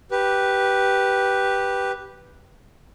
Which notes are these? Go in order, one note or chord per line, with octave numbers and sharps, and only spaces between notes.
G4 B4